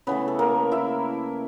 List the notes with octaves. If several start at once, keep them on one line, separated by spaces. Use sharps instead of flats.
C#3 E3 A3 B3 B4
A4
A#3 A#4
E4 E5